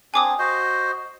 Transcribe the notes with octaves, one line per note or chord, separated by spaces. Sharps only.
C4 D4 G#4 G#5 D6 D#6
F#4 C5 D#5